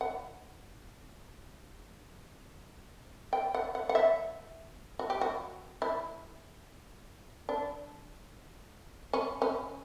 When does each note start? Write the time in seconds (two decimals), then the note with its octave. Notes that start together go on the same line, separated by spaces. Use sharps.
0.01 F#5
3.33 G5
3.54 F#5
3.75 F#5
3.89 F#5
3.95 E5
4.99 F#4
5.10 G4
5.21 F#4
5.82 E4
7.49 D4
9.13 C#4
9.42 C#4